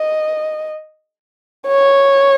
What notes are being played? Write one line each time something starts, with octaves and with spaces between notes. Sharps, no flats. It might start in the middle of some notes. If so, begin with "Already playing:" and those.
Already playing: D#5
C#5